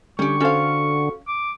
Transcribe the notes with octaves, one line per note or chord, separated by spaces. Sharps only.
D3 G3 C#4 G4 C#6
C#4 F#4 A4 C5 F5
D6